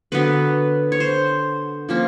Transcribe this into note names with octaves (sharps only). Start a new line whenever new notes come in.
D3 F#3 B3 B4
C#5
C5
F3 A#3 C#4